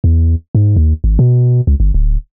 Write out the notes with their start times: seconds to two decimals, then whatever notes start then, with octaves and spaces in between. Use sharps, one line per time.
0.04 E2
0.55 G#2
0.76 D#2
1.04 G#1
1.19 B2
1.67 C#2
1.80 G1
1.94 D1